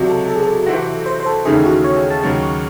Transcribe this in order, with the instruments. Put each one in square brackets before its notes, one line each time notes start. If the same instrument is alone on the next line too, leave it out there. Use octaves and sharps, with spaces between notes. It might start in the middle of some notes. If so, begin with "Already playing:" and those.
Already playing: [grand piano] C#2 C3 F#3 [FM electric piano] F#4
[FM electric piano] A4
A4
G#4
A4
[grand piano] C3 E3 C4 F#4
[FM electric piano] C5
C5
A4
[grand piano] D#2 C#3 E3 A3 D#4 [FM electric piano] G#4
[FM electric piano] F#4
C#5
G#5
A5
[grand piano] D#2 C#3 F#3
[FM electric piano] C#6